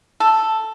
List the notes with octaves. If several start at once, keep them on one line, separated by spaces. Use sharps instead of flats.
A4